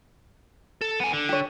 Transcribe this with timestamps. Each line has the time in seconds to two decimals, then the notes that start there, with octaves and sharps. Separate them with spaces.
0.81 A4
1.00 B3 G#5
1.13 D3
1.29 G4 C#5